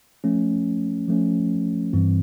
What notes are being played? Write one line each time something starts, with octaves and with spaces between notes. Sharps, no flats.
F3 A3 C#4
F3 A3 C#4
G2 E3 G3 C4